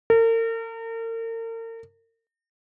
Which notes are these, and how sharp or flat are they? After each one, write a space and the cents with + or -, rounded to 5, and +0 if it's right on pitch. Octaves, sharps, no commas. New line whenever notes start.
A#4 -40